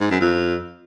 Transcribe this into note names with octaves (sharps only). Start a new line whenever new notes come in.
G#2
F#2
F2